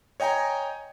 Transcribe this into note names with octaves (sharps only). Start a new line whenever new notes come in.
C#5 D#5 G5 G#5 A#5